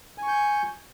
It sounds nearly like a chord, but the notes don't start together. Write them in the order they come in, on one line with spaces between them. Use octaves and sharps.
G#5 C#6 G6